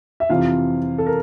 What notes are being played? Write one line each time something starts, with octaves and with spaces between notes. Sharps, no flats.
E5
F2 C3 E3 F4 F5
A4
A#4